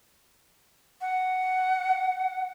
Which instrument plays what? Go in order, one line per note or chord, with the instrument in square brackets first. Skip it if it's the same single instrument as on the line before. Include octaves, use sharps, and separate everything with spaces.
[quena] F#5